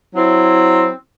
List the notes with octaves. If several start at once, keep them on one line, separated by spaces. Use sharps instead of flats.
F#3 C4 E4